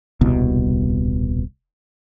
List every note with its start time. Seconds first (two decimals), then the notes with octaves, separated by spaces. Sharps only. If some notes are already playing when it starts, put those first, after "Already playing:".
0.21 D#1 C2 B2